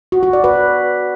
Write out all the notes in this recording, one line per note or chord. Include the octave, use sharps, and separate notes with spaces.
F#4
F#4
D5
B4